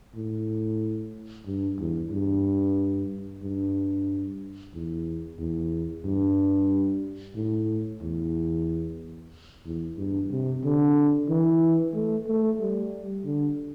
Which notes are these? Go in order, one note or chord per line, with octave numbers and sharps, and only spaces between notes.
A2
G2
E2
G2
G2
E2
E2
G2
A2
E2
E2
G2
C3
D3
E3
A3
A3
G3
D3